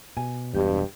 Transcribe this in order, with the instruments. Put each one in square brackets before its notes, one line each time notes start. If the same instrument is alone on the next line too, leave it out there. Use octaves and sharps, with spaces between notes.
[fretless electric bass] B2 [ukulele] G#5
[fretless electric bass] E1 B2 [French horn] G2 [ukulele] G4